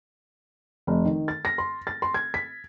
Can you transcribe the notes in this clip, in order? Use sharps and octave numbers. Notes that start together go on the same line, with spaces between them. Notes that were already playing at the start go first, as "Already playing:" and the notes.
F1
D#3
A6
A#6
C6
A6
C6
G#6
B6